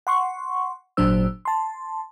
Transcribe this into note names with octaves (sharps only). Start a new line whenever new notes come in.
F#5 C6 C#6
G#1 A#2 F#3 D4 C5 E6
A5 C6